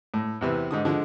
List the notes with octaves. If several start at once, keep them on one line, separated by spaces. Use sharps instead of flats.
A2
E2 C3 E3
G#2 D3 D#6
D3 F3 G#3